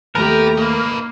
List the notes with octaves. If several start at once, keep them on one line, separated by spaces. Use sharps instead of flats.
D#2 A3 B3 G4 A#4 A#5
A#3 D#4 B4